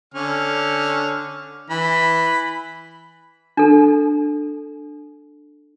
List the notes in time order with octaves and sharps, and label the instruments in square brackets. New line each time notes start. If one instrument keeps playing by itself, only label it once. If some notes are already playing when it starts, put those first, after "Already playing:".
[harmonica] D3 C#4 F6
E3 B5
[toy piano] D4 A4